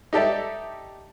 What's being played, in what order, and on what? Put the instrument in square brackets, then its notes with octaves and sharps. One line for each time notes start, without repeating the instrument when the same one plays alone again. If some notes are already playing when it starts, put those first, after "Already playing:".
[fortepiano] D#4 G4 A4 D5 E5